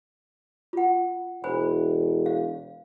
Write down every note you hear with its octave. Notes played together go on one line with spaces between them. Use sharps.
F4 F#5
E1 C5 G#5 B5
F5